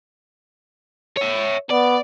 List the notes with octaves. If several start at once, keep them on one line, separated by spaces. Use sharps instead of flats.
C#5 E5
B3 D5